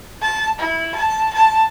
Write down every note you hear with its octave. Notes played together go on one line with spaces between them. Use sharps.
A5
E4
A5
A5